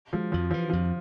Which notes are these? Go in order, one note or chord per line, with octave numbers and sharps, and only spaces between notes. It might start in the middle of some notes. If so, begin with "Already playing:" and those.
F3 G#3
F2 F3
E3 F3
F2 F3